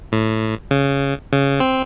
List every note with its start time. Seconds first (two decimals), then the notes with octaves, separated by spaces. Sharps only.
0.12 A2
0.71 C#3
1.33 C#3
1.60 C4